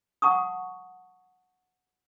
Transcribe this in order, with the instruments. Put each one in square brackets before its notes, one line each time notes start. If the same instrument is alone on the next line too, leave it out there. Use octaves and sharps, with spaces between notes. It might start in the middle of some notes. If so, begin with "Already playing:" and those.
[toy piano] F#5 A5 C#6 D#6